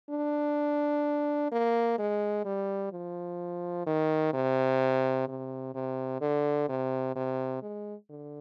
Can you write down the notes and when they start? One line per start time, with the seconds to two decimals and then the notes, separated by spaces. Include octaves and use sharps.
0.10 D4
1.52 A#3
1.99 G#3
2.45 G3
2.92 F3
3.86 D#3
4.33 C3
5.28 C3
5.75 C3
6.21 D3
6.69 C3
7.15 C3
7.62 G#3
8.09 D3